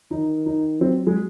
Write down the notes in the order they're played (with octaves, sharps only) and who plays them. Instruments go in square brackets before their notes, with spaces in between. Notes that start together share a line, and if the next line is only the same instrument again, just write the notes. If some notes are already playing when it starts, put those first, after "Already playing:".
[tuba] D#3 [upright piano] D#4
[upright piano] D#4
[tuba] F#3 [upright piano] C4
[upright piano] G#3